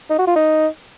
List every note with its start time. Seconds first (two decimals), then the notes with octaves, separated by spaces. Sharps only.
0.10 D#4
0.18 F#4
0.27 F4
0.36 D#4